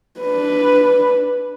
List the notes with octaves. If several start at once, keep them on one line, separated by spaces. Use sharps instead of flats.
D4 B4